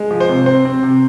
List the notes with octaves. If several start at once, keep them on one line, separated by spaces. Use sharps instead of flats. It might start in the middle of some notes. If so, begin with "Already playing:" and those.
Already playing: G#3
F3
C5
C3
C4 C5
C4
C3